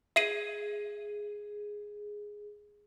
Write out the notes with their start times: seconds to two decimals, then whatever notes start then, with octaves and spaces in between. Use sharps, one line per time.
0.16 G#4 E5 C7 D#7